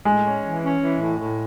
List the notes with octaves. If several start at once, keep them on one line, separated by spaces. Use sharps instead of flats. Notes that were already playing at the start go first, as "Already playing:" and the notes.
A2 G#3
C#4
E3
C#4
E3
A2
A2